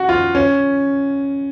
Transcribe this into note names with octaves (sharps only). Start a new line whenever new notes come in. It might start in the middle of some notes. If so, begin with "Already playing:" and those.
Already playing: F#4
F4
C#4